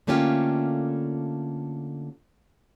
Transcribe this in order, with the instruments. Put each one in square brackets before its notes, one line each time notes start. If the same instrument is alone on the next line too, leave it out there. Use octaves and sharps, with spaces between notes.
[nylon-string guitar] D3 A3 A#3 C#4 F4 G4